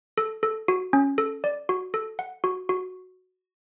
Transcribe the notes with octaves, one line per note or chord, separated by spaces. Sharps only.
A4
A4
F#4
C#4
A4
D5
F#4
A4
F#5
F#4
F#4